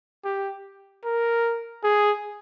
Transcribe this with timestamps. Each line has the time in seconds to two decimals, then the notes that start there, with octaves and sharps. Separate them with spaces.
0.25 G4
1.05 A#4
1.84 G#4